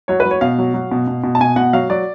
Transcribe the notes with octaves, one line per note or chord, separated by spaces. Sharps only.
F#3 C#5
B4
F#3
C#5
B2 F5
F#3
F#3
B2
B2
B2
A5
B2 G#5
B2 F#5
F#3 F5
F#3 D5